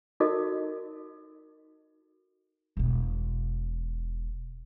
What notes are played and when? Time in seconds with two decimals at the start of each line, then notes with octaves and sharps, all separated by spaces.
0.20 D#4 F#4 A4 A#4 D#5
2.77 E1 B2